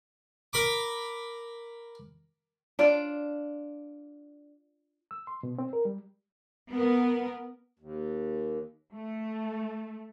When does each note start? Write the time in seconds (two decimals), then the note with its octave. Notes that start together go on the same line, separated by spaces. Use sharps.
0.53 A#4 B5 D6
2.79 D4 F4 D5
5.11 E6
5.27 C6
5.43 B2
5.58 C4
5.73 A#4
5.85 G3
6.72 B3 A#4
7.79 D#2
8.93 A3